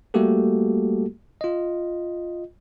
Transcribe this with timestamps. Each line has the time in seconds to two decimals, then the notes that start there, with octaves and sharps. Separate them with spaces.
0.14 G3 A3 A#3 F#4 G4 A4
1.41 F4 D#5